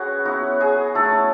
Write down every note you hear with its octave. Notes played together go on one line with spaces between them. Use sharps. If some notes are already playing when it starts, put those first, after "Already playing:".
Already playing: C#4 F#4 G#4 B4 C#5
F#3 B3 E4 F#4
G#4
F#3 A3 B3 E4 A4